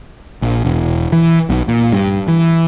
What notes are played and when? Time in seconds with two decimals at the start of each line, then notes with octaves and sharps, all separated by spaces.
0.42 A#1
0.65 E1
1.12 E3
1.50 B1
1.68 A#2
1.92 G2
2.28 E3